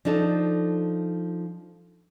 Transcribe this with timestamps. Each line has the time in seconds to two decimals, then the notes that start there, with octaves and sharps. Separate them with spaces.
0.05 F3 D4 D#4 A4